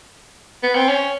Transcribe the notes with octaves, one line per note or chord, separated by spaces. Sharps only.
B3
C4
C#4